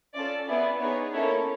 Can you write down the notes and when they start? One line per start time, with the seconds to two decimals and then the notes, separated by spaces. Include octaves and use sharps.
0.14 C#4 F4 A4 D5
0.47 B3 E4 G#4 D5
0.80 B3 D#4 G#4 C#5
1.13 A#3 C#4 E4 A4 C#5